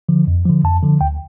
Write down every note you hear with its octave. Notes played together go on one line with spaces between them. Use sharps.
D3 F3
F2
D3 F3
F2 A5
D3 F3
D2 G5